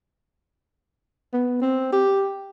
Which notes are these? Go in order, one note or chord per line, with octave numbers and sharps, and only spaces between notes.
B3
C4
G4